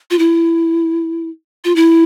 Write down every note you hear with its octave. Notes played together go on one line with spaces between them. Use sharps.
F4
E4
F4
E4